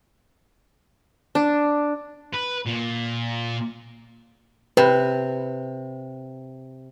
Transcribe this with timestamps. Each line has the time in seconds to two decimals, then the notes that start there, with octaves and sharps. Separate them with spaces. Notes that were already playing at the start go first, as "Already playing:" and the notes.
1.35 D4
2.34 B4
2.66 A#2
4.77 C3 B4